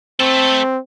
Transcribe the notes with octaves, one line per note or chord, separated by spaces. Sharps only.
A3 C4 A4